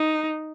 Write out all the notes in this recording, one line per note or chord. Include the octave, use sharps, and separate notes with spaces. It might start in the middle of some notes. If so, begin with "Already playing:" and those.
Already playing: D#4